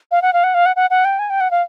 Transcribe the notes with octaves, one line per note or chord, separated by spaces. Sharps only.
F5
F#5
F5
F#5
F5
F#5
F#5
F#5
G5
G#5
G5
F#5
F5